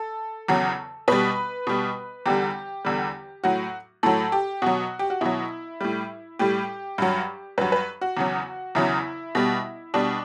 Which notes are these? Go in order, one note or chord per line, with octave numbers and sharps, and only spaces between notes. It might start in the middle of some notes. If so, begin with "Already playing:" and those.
Already playing: A4
E2 C#3 F#3
B2 G3 B4
B2 G3
E2 D3 G3 G4
E2 D3 G3
A2 F#3 F#4
A2 F#3 A4
G4
B2 F#3 F#4
G4
F#4
B2 F#3 E4
A2 G3
A2 G3 G4
G2 F#3
G2 F#3 B4
B4
F#4
E2 C#3 F#3
E2 C#3 F#3 E4
B2 G3
B2 G3 D4